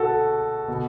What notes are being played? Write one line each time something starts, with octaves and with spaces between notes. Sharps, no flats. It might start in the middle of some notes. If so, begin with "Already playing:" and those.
Already playing: B2 F#4 A4
B2